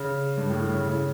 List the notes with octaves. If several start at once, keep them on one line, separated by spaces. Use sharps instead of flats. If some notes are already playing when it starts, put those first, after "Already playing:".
Already playing: C#3
G2
A2
A2
C#3
C#3